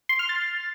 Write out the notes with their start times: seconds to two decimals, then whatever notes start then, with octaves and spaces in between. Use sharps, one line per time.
0.09 C6
0.19 F6
0.29 A6